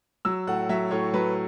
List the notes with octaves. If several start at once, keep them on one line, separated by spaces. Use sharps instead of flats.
F#3 E6
A2 F#5
F#3 E5
A2 C#5
F#3 B4